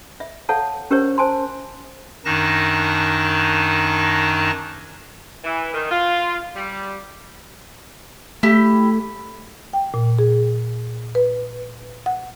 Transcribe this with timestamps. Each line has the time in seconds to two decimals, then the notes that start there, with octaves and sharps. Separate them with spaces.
0.20 E5
0.49 A4 C#5 F5 F#5 A5
0.91 C#4 G4 A#4 C5 C#5
1.18 C5 G#5 A5 C6
2.25 F#2 D#3 D4 D#4 A5 A#6
5.44 E3
5.74 D#3
5.91 F4
6.55 G3
8.43 A3 E4 G4
9.73 G5
9.94 A#2
10.19 G#4
11.15 B4
12.06 F#5